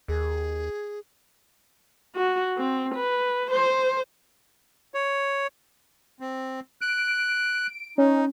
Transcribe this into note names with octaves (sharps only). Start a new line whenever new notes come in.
D#2 G#4
F#4
C4
B4
C5
C#5
C4
F#6 D7
C#4 D#4